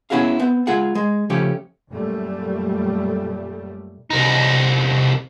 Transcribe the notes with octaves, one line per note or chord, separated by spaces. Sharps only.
B3 C#4 E4 F#4 G#4 F5
B3 C4
G#3 F4 G#4 F#5
G#3
C#3 F3 A3 C#4 G4
F#2 A#2 G3 A3
C2 D#4